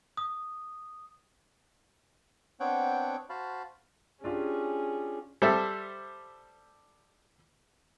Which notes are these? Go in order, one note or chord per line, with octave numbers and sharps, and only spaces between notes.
D#6
B3 C4 D4 C#5 F#5 G5
F#4 C5 F5 A5 B5
C#4 D4 F4 G4 G#4
G3 A4 C5 E5